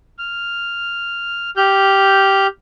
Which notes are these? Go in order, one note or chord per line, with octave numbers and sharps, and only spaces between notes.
F6
G4 F6 G6